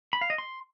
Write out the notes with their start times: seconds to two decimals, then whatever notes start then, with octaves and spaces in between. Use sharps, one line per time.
0.13 B5
0.21 F5
0.30 D#5
0.38 C6